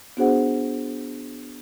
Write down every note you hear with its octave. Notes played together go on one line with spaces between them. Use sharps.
B3 D4 F#4 G#4 C5 F#5